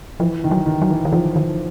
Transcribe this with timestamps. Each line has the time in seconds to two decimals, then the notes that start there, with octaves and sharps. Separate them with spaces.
0.20 E3 F3
0.44 D#3
0.51 F#3
0.66 D#3
0.82 F#3
0.90 E3
1.05 D#3
1.12 E3 F3
1.36 D#3